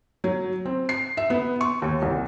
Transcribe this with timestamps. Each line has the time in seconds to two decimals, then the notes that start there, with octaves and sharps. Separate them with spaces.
0.24 F#3
0.66 C4
0.89 C7
1.17 E5
1.30 B3
1.61 C#6
1.82 D#2
2.02 C2